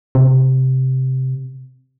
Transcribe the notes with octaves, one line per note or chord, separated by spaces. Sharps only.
C3